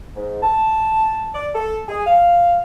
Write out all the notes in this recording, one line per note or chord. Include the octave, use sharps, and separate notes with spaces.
G#2
A5
D5
A4
G#4
F5